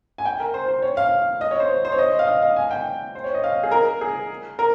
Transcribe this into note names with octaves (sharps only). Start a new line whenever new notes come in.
G#5
G5
A#4
C5
C5
C#5
F5
D#5
C#5
C5
C5
C#5
D#5
F5
D#5
F5
G#5
G5
C5
C#5
D#5
F5
G#4
A#4
G#4
A#4